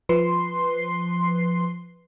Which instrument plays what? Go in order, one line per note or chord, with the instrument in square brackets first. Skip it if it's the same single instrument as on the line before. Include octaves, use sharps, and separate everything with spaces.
[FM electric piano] F3 B4 C6 C7